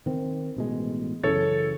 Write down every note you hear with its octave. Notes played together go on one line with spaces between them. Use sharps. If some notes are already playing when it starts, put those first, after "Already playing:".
D#3 C4
A1 B2 G#3
F#2 C#3 E3 A4 C#5 A6